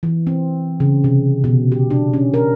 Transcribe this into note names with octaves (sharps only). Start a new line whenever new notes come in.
E3
C4
C#3
C3
B2
G4
D4
C#4
A#4